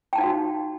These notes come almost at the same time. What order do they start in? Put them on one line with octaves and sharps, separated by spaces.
G5 A5 D#4 F5 F#4